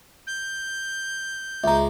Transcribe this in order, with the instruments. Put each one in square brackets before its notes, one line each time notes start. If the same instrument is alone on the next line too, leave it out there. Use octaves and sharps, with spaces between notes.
[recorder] G6
[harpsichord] C#2 G#3 [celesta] E5 A#5